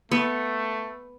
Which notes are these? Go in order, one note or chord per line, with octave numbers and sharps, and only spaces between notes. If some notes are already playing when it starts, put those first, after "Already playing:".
A3 B3